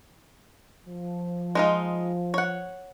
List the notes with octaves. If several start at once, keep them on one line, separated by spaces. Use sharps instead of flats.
F3
G#3 D#4 F4
C#5 F#5